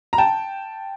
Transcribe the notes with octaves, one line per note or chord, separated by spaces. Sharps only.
A#5
G5 A5